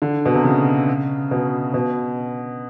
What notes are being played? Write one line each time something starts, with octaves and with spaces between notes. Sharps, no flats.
D3
B2
C3
C#3
B2
B2